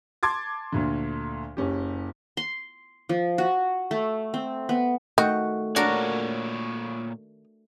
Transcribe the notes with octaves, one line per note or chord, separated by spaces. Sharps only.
A5 C6 D6 G#6 A6
D2 A#2 D3
F#1 C#4 G4
C6
F3
F#4
A3
C4
B3
D#3 A3 F#4
A#2 D4 F#4 A#4 C#5